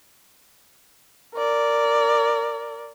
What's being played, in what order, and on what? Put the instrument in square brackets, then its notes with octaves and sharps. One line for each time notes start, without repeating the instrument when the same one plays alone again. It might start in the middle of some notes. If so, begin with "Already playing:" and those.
[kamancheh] A#4 D5